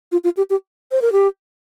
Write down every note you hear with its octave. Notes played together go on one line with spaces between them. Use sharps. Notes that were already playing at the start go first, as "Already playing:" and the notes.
F4
F4
G4
G4
C5
A#4
G4